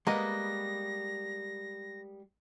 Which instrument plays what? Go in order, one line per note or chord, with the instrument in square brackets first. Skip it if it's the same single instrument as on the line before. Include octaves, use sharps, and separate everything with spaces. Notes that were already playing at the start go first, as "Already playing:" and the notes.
[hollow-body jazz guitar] G3 G#3 [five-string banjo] A#3 B3 D#5 [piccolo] A#6